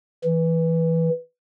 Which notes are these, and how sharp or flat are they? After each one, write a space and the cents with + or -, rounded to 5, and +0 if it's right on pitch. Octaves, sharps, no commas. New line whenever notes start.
E3 -5